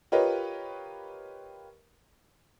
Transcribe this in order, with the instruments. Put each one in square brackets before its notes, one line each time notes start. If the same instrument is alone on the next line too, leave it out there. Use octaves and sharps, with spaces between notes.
[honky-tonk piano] F4 G4 A#4 B4 C#5 D#5